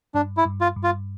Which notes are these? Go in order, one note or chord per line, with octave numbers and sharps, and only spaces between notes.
G2 D4
E4
G2
F4
G2
F4